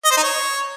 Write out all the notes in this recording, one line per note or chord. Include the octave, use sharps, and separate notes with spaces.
D#5
C5
D#4
C#5